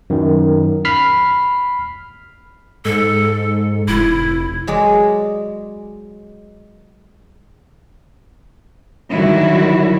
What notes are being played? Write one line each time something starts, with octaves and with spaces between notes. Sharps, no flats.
F#2 D#3
B5 F6 B6 C7
G#2 A4
F1 E4
F#3 G#3 D5
D3 D#3 F#3 G3 E4 F#4